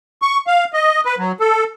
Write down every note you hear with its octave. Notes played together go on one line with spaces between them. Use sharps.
C#6
F5
D#5
B4
F#3
A4